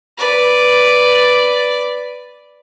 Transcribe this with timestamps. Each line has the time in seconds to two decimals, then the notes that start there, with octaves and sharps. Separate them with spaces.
0.18 B4 D5